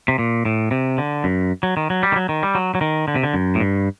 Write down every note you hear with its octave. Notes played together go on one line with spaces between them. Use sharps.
C3
A#2
A2
C3
D3
F#2
F#3
D#3
F#3
G3
D#3
F#3
D#3
G3
F#3
F#3
D#3
D3
C3
D3
F#2
A2
G2